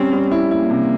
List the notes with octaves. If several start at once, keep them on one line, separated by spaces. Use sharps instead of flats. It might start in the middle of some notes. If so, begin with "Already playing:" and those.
Already playing: G3 C4 C#4
G3
E4
A#3 E4
C3